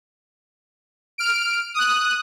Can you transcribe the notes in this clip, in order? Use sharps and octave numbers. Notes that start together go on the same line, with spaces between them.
F6 D7
D#6 F#6